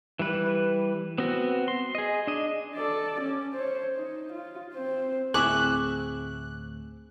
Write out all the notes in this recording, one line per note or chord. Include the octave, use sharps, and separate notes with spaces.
E3 G3 B4
B3 C4 F#4
C6
G#4 D#5
D4 D#5
A4 D5
C#4
C5 C#5
D#4
F4
C4 C5
D2 A2 C4 E4 G#4 C#6 D6 F#6